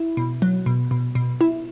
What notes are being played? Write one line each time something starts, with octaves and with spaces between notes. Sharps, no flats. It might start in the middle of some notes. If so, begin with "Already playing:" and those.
Already playing: E4
B2
F#3
B2
B2
B2
E4